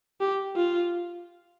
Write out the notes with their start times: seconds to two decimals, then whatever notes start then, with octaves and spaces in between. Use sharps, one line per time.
0.21 G4
0.57 F4